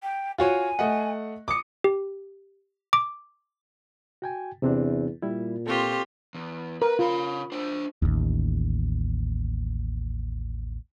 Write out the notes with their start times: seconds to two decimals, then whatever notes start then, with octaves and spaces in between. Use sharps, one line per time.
0.02 G5
0.38 F4 F#4 C#5 G#5
0.79 A3 D#5 F#5
1.48 D6 D#6 C#7
1.84 G4
2.93 D6
4.22 F#4 G5 G#5
4.62 E2 C3 C4 D4
5.22 A#2 G3 E4
5.67 C4 F4 G4 A4 C#6
6.35 E2
6.82 A#4 B4
6.99 C#3 F4 B5
7.52 D4 C5
8.02 A1 D#2